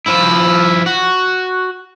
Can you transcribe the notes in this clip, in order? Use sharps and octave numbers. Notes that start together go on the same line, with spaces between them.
F3 E4
F#4